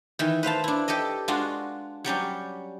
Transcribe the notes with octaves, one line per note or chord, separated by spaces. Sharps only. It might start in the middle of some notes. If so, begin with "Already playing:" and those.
D#3 E3
B4 C5 F5 A5
D4 E4
G4 A4 D5 D#5
G#3 D4 F4 F#4
F#3 G3 C#4 G4